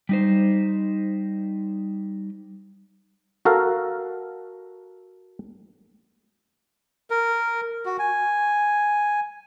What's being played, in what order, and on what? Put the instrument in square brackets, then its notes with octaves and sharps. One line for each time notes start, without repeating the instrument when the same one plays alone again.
[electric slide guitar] G3 D#4 C5
[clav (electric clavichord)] F#4 A4 A#4 F5
[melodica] A#4
F#4
G#5